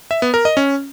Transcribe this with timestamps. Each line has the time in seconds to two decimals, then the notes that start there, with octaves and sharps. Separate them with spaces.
0.11 E5
0.22 B3
0.34 A#4
0.45 D#5
0.57 C#4